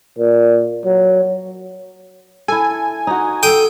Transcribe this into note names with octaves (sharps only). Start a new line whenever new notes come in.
A#2
F#3
E4 A4 G#5
D#4 F#4
A4 G5 D#6